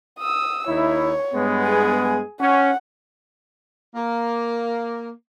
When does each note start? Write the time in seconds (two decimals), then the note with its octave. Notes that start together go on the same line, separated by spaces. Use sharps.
0.19 D#6 E6
0.68 D#2 D#4 E4 C#5
1.33 G2 G#3 B3
1.63 G#4 G#5
2.40 C#4 F#5
3.94 A#3